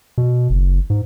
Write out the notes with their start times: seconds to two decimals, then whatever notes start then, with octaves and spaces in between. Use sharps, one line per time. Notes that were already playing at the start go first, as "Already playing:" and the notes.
0.18 B2
0.50 F#1
0.90 G#2